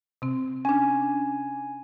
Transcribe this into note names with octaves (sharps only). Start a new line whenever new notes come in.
C3 C4
C#4 D4 G#5